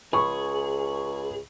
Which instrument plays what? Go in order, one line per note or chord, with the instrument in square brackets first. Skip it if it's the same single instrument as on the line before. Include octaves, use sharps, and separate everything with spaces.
[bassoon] C#2 [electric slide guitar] G#4 [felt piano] B5 C#6